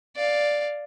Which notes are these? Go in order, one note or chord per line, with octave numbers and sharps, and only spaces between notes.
D5 F5